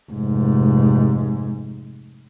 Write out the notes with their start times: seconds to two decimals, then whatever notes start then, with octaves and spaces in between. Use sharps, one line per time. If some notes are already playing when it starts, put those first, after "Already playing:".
0.11 F1 G#2